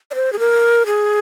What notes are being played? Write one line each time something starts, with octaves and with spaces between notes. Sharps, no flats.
D5
C5
G#4
A#4
G#4